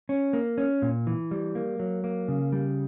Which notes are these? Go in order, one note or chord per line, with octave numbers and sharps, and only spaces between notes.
C#4
A#3
C#4
A#2
E3
G3
A#3
F#3
A#3
C#3
G3